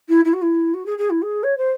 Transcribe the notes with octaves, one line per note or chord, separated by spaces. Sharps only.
E4
E4
F#4
E4
F#4
G#4
G#4
E4
G#4
C#5
C5